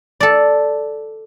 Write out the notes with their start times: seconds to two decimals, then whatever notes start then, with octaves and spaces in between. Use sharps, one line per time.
0.20 A4 D5